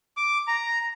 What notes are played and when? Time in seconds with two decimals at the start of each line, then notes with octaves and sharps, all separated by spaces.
0.17 D6
0.47 A#5